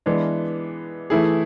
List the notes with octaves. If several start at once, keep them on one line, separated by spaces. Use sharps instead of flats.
E3 G#3 B3 D4
E3 A3 E4 G#4